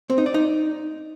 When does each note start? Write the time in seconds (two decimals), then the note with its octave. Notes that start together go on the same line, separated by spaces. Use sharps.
0.10 C4
0.18 D#4
0.26 D5
0.34 D#4